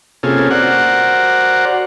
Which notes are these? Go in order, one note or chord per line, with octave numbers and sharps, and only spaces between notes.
C3 A#3 C#4 F4 G#4 A4
F#4 A#4 C5 D5 F#5